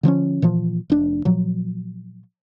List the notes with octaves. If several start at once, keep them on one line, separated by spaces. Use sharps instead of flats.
D3 F3 C4 C#4
A#2 E3 F3
F1 D4
A#2 F3 F#3